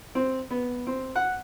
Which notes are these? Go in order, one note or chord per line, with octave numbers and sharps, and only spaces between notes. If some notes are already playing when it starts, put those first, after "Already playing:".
C4
B3
C4
F#5